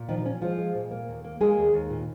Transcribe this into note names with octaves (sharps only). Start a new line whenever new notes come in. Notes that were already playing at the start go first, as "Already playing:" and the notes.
Already playing: A#2
D#3 F3 D#4
F3 C#4
F3 G#3 F4
G#3
A#2
A#3
D#2
A#3
G#3 A#3 G#4
D#2
D#2
A#2